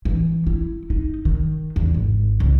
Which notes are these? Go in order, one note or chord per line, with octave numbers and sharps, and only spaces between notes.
E3
E4
D#4
D#3
E2
G#1
C#2